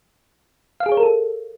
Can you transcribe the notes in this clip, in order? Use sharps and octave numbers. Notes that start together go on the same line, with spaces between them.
F5
G#4
C#5
A#4
A4